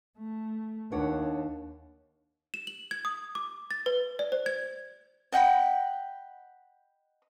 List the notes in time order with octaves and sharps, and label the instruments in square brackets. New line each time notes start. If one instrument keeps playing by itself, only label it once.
[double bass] A3
[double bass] D#2 [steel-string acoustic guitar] D4 C#5 F#5
[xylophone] E7
F#7
G#6
D#6
D6
A6
B4
D5
C5
G#6
[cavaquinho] D#5 F#5 G5 B5